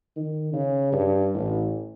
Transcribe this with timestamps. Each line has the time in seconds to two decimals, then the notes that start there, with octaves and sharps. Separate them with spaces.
0.16 D#3
0.53 C#3
0.92 G2
1.34 A1